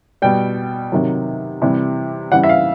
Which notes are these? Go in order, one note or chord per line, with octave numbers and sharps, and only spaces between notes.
B2 G3 G5
C3 D#3 F#3
C3 E3 G3
C#3 E3 G3 F#5
E5
F5